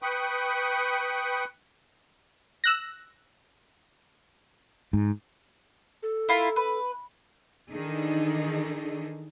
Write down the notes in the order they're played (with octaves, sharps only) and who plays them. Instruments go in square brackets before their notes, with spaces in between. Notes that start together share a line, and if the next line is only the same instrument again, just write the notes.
[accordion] B4 G5 B5 C#6 D#6
[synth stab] E6 F#6 A#6
[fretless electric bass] G#2
[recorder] A4
[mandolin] E4 F4 A#4
B4
[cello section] D#3 E3 D4 D#4 G#4 A4